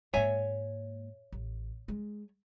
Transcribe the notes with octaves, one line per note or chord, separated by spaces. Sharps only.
G#2 A#3 C#5 E5 G#5
A1
G#3